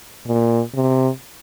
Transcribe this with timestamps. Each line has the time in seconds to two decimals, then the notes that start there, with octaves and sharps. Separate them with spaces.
0.27 A#2
0.75 C3